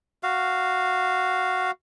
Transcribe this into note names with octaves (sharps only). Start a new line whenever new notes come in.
F#4 F5